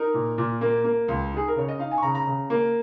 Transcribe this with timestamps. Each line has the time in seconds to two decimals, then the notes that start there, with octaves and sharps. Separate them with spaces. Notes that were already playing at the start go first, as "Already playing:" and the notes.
Already playing: D#4 A#4
0.14 A#2
0.38 A#2
0.61 A#3
0.84 A#3
1.08 C#2
1.33 D#4 G#4
1.48 A#4
1.56 C#3 C#5
1.68 D#5
1.79 D#4 F5
1.91 G#5
1.98 C#6
2.03 C#3 A#5
2.15 A#5
2.27 C#3
2.50 A#3